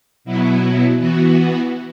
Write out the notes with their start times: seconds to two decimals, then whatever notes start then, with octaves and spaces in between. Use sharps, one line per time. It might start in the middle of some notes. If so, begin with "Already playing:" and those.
0.25 B2 F#3 B3 E4
0.98 E3 B3 F#4